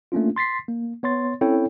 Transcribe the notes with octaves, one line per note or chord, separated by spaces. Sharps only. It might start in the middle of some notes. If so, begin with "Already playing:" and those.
A3 A#3 C#4 D4 F4
C6 A6 B6 C7
A#3
B3 C#5 C6 A6
C4 C#4 E4 A4 C#5 G5